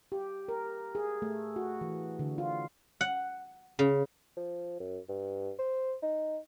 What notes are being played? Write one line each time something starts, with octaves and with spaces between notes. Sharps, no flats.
G4
A#4
G#4
A3
F#4
E3
D3
F4
F#5
C#3
F3
F#2
G2
C5
D#4